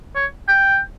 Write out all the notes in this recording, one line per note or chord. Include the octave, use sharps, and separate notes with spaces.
C#5
G5